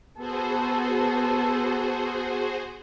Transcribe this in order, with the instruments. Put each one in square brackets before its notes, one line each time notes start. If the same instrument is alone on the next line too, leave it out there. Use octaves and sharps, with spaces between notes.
[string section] B3 A4 [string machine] F#4 G#4 C5